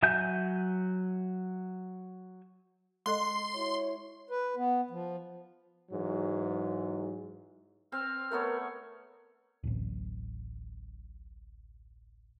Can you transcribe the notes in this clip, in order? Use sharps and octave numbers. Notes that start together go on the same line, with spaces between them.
F#3 E5 G#5 G6
G#3 A4 D#5 C6
E4 F#4 C#5
B4
B3
F3
G#2 E3 F#3
C4 F6
A3 B3 A#4 C#5
D1 A1